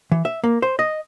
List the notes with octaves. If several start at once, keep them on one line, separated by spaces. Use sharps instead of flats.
E3
E5
A#3
C5
D#5